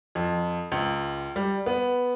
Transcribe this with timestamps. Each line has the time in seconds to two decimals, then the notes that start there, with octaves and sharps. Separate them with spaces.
0.15 F2
0.72 C#2
1.36 G3
1.66 B3